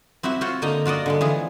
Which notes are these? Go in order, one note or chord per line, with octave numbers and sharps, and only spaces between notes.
C4 E4 F#4 G4 E5
F4 F#4 C5 C#5
D3 A#3 D#4 D#5 A#5
F4 F#4 D5 D#5
D3 G3 G#3
E3 F3 G#4